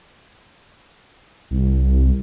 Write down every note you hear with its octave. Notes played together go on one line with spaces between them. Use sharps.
C2